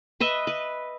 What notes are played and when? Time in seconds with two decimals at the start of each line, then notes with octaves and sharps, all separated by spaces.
0.20 B4 D#5 E5
0.47 B4